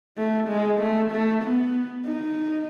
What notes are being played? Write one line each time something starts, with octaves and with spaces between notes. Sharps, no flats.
A3
G#3
A3
A3
B3
D#4